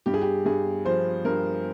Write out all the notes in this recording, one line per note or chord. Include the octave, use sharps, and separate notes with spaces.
G2 G4
G#4
G4
G2 G#4
F3 C5
G2 A#4